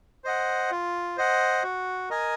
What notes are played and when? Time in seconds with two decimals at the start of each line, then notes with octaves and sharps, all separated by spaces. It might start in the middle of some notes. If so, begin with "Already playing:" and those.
0.24 C5 D#5 F#5
0.71 F4
1.17 C5 D#5 F#5
1.63 F#4
2.10 A#4 D#5 G#5